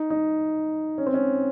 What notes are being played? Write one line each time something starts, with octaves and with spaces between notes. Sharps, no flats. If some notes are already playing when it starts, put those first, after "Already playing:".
Already playing: D#4
D#4
C#4
C4
C#4